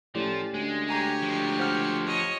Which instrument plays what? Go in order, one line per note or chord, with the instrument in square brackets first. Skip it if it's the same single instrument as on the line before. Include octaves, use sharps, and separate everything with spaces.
[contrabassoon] A2 [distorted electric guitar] F3 [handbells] C#4 G4 D5
[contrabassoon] D2 [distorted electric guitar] G#3
[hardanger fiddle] G4 C#5 [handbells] G#5 A#5 G#6
[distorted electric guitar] F3 G#3
[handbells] C5 F#5 F6
[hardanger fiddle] C#5 D#5